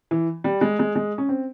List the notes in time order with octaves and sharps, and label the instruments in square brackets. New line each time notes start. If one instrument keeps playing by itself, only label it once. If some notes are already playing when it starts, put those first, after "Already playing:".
[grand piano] E3
G3
G#3
G#3
G#3
C#4
C4